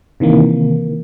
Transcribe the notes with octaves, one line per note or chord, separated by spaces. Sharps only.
C3 D#3 E3 A#3